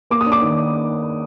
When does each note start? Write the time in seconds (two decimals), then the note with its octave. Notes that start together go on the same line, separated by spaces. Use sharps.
0.11 A#3 D6
0.21 D#6
0.26 D4
0.32 D6
0.41 D#3